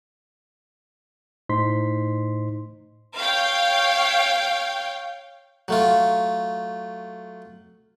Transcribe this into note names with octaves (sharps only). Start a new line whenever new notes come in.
A2 D#4 C5 C6 B6
C#5 F5 G5
F#3 A3 F4